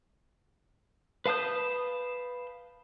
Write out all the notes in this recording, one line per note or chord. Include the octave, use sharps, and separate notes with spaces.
B4 F5 A5 D#6 G6